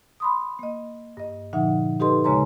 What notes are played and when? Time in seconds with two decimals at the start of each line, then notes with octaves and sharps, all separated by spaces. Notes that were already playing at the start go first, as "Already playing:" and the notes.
0.20 B5 C6 D#6
0.59 A#3 D#5
1.17 G2 D#5
1.53 A#2 D3 F3 D#4 E5 F#5
2.00 D#4 G4 A4 B4 D#5 C6
2.24 D#2 C#3 G#3 C#5 A#5 C6